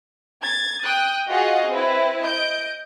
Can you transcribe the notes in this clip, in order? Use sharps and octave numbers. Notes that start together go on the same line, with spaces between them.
G#6 A6
G5 D#6 F#6
F4 F#4 G#4 D#5 F5 F#5
C4 E4 B4
D#5 G6 D7